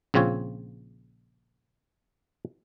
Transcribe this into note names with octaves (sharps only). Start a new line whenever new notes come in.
A#1 C#3 C4 F4 C#5